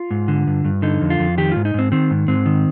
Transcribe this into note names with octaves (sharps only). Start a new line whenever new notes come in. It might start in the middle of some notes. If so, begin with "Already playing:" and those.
Already playing: F4
G#2
D3
G2
G2
D3 D#4
F2
F4
F2
D#3 G4
G#2 F4
D#4
G#2 C4
D#3 C4
G#2
G#2 C4
D#3